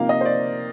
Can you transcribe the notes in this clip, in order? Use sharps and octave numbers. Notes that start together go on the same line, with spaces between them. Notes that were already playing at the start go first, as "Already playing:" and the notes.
Already playing: C3 F3 A#3 D#4 F5
D#5
C5
D5